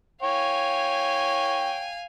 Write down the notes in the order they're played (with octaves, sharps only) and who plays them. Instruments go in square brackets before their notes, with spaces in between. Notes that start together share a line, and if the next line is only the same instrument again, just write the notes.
[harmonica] C#5 G5 [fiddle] F5 G#5